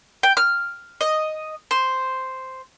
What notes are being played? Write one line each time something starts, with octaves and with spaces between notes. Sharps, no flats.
G5
F6
D#5
C5